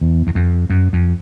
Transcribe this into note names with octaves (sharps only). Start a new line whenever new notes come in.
E2
E2
F2
F#2
F2